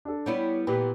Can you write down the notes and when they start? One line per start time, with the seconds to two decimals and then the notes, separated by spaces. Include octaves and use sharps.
0.05 D4 A4
0.26 G3 B3 E4 C#5
0.67 A#2 E3 B3 G4 B4